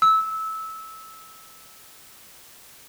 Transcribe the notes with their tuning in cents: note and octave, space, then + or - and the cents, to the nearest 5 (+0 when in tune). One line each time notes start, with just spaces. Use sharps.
E6 -20